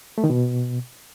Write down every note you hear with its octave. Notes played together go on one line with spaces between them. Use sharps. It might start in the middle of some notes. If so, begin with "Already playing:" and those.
A3
D#3
B2